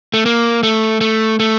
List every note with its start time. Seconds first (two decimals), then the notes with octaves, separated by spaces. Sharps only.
0.14 A3
0.26 A#3
0.63 A3
1.01 A3
1.40 A3